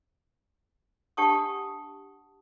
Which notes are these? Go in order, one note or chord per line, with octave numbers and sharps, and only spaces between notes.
D4 G4 F#5 A5 C#6 D#6